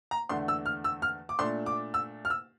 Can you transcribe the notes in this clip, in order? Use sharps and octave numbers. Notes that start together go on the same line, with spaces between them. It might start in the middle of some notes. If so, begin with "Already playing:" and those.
A#5
E2 D3 A3 D4 C6
E6
F6
E6
F6
D6
A#2 A3 D4 C6
D6
E6
F6
E6